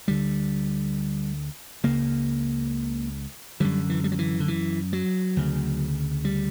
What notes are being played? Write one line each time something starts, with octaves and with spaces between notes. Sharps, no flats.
D2 D3 G3
C#2 C#3 A#3
F#2 D3 G3
E3
G3
F#3
E3
D3
E3
F#3
D2 C#3
G3